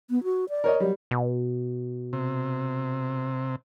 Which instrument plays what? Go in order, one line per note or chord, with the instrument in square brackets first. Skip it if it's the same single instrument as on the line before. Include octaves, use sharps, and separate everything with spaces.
[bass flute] B3
F#4
D5
[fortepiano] A#4 C#5 D#5
[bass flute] F#3 [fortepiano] G3
[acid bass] B2
[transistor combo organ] C3